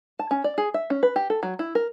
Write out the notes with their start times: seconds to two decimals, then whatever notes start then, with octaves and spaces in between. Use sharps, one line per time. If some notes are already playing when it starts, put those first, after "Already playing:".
0.19 A5
0.31 C#4
0.44 D5
0.58 G#4
0.74 E5
0.90 C#4
1.03 B4
1.16 G4
1.30 A4
1.43 F#3
1.59 E4
1.75 A#4